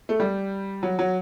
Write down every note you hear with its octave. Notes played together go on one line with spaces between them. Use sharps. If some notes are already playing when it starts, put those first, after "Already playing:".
A3
G3
F#3
F#3